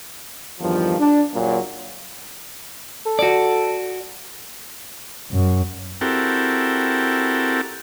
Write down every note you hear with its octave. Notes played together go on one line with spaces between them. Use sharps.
E2 G2 D#3 F3
D4
F#1 A#2 F#3
A4
F#4 D5
F#2
C4 E4 F#4 G4 A4 A#4